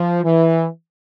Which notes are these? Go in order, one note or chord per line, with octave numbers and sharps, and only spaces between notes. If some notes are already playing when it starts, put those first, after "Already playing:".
Already playing: F3
E3